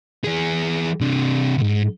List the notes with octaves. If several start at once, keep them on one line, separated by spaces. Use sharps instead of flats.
E3 G#4
C3 D4
C#2 G#2